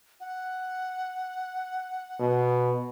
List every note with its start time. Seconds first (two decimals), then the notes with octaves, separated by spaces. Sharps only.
0.20 F#5
2.20 B2